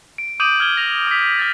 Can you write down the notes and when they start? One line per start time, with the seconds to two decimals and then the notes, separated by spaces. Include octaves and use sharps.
0.18 D7
0.40 D6 D#6 G6 D7 D#7 F#7
0.60 F6 G#6 G7
0.77 A#6 F7
1.07 D#6 B6
1.39 F6 A6